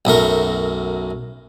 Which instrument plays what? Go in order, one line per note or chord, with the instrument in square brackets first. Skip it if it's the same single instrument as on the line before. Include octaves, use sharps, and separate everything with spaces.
[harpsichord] B1 F#2 A3 A#4